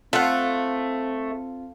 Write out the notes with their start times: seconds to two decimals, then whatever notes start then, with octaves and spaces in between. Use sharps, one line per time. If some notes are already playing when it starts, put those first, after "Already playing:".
0.13 A3 C4 F4 A4 F#5